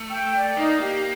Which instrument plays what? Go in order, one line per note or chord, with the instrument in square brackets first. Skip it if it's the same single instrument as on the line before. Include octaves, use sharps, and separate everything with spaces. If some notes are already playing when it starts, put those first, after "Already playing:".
Already playing: [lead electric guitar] A3
[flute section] G5
D5
[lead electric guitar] A#3 [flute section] D#4
[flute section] G4